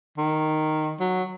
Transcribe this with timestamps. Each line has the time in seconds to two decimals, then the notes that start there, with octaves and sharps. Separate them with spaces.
0.18 D#3
1.00 F#3